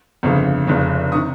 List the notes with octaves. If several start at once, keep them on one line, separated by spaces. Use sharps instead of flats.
G1 F2 C#3
F1 F2 C#3
C3 D#3 C#6 D#6